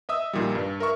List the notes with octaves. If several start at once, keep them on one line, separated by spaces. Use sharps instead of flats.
D#5 E5 D#6 E6
A#1 A#2 D#3 G3
G2
A#4 E5 C#6